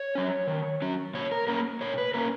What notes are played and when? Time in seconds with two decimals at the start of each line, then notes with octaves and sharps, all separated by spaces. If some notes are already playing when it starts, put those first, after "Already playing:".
Already playing: C#5
0.15 F#3 C#4
0.47 D#3
0.82 F#3 C#4
1.14 A#2 C#5
1.32 A#4
1.47 A#3 C#4 A#4
1.81 A#2 C#5
1.98 B4
2.14 A#3 C#4 A#4